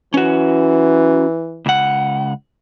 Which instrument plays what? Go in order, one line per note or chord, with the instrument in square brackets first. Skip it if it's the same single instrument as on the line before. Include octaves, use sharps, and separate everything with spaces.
[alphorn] E3 [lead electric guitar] C#4 F#4
[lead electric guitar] C#2 F#5